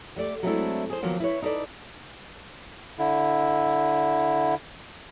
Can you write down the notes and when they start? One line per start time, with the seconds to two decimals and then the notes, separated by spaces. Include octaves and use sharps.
0.16 G3 A3 D5
0.43 F#3 G#3 A3 C4 D4 E4
0.90 G#4 C5
1.02 D#3 F3 F#3 A#3 B3
1.20 E4 B4 C#5
1.42 D#4 E4 A4 B4 D5
2.99 D3 E4